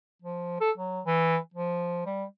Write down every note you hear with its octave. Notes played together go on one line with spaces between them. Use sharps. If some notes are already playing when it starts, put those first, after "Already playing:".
F3
A4
F#3
E3
F3
G3